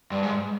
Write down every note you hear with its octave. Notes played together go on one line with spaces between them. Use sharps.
G2
G#2